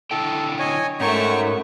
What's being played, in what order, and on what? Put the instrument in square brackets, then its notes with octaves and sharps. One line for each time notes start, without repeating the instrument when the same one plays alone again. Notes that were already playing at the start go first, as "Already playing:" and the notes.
[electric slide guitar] D3 E4 G5 [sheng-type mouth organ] A4
[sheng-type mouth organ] C#5 D#5 G#5
[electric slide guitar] G#2 [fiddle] A3 C#6 [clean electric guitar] C#4 F#4 A#4 [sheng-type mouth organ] G5